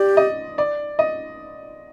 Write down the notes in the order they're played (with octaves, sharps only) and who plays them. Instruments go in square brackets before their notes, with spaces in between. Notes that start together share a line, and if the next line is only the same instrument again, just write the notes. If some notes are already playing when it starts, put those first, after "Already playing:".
Already playing: [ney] G4 [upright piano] D5
[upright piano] D#5
D5
D#5